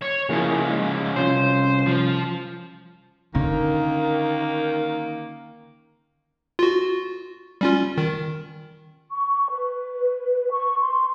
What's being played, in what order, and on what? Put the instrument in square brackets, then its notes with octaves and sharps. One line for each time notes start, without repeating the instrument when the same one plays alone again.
[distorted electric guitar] C#5
[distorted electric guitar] C#3 F3 [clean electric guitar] A#3 E4 G#4
[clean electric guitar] G#3
[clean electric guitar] C2 C#4 F4 [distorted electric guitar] C5
[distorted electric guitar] F3
[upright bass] D3 C#4 [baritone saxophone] D#3 [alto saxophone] A#3
[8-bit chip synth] F4 F#4
G3 C#4 F4
D#3
[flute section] C#6
B4
C#6
C6